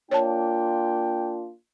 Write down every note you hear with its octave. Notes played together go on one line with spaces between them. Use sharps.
A#3 D4 F4 C#5 G5 A5